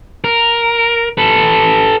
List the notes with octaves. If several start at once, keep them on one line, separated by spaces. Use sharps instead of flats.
A#4
A4 B4